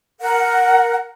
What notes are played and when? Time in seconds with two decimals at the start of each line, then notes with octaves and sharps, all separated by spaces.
0.21 A#4 F#5